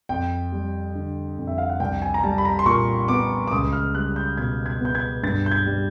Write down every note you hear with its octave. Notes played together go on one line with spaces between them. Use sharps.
F2 G5
G3
D3
F2
E5
F5
F#5
C2 G5
G#5
A#5
G3 A5
B5
A#5
C6
A#2 C#6
B3 D6
D6
C#2 D#6
F6
G3 F#6
G6
B2 G#6
G#6
B3 G6
G#6
G2 A6
G6
G#6
G3